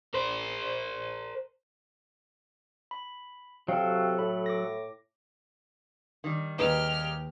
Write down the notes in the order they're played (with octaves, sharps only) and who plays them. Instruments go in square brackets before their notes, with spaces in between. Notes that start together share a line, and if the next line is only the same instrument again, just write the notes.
[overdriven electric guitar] A#4 C5
[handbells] B5
[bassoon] C3 [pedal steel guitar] F#3 A4 [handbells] F5 G5
[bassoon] A2 [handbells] B5
[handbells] D6 A#6
[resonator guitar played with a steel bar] D#3 G3
[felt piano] D#2 B4 [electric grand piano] A#3 D#4 G#4 [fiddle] G4 F6